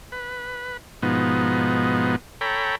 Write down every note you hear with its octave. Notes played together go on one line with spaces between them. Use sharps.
B4
G#2 B2 F3 B3 D#4
A4 C#5 G5 A#5 B5